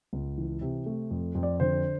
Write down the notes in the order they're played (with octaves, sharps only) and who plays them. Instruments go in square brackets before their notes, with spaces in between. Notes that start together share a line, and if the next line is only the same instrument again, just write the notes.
[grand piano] C#2
E3
C3
A3
F2
F2
D5
D3 C5